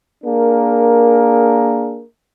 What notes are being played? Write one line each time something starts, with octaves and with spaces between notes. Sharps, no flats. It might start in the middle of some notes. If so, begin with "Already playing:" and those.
A#3 D4 G#4 A#4